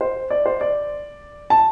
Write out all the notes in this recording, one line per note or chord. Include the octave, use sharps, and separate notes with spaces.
C5
D5
C5
D5
A5